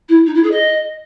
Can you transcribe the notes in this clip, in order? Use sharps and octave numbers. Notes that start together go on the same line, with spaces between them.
E4
D#4
E4
G#4
D#5